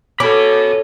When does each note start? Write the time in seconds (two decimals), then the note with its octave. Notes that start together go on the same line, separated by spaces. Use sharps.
0.20 C#4 F#4 A4 B5 D6